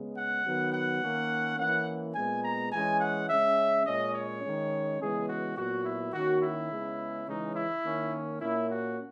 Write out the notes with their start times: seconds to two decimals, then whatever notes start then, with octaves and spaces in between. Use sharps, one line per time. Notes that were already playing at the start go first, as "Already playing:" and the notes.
Already playing: C#3 G#3 B3
0.16 F#5
0.45 D#3 F#3 B3
0.73 F#5
1.02 D#3 A#3 C#4
1.58 E3 A#3 C#4 F#5
2.15 A#2 G#3 B3 G#5
2.44 A#5
2.72 E3 G#3 C#4 G#5
3.00 F#5
3.29 C#3 G#3 C#4 E5
3.86 A#2 G#3 C#4 D#5
4.14 C#5
4.43 D#3 G#3 C#4
5.00 C#3 E3 G#3 B3 G#4
5.29 F#4
5.56 A#2 F#3 B3 F#4
5.85 E4
6.13 D#3 A#3 C#4 F#4
6.42 E4
6.71 C#3 G#3 B3
7.27 C#3 E3 G#3 C#4 D#4
7.55 E4
7.84 D#3 A#3 C#4
8.41 A#2 A#3 C#4 E4
8.69 F#4